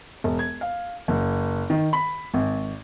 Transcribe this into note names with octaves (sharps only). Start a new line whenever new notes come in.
E1
G#6
F5
F#1
D#3
B5
G#1